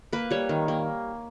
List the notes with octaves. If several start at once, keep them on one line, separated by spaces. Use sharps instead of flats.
A#3 B4
G3 C#5
D#3
A#3